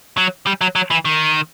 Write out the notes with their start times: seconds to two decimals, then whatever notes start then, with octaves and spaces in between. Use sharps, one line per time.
0.18 F#3
0.47 G3
0.61 F#3
0.75 F#3
0.91 E3
1.05 D#3